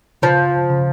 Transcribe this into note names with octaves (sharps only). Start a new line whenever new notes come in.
C#3 F3
C#3